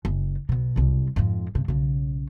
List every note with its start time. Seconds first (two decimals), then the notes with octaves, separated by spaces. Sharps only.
0.05 F#1
0.49 B1 B2
0.76 E1 C2
1.16 F2 G#2
1.55 G2 C3
1.68 B1 C#3